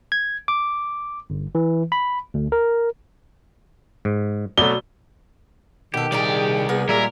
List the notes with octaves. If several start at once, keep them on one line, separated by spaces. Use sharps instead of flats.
G#6
D6
G1
E3
B5
D2
A#4
G#2
B2 F#3 A3 D5 G7
B2 D#3 G4 A4
C2 A#2 G#4 D5 A#5
A#3 B3 G#4
A#2 G3 G#3 A#4 E5